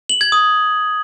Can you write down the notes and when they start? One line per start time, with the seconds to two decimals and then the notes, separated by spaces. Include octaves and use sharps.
0.09 F#7
0.21 G#6
0.32 D#6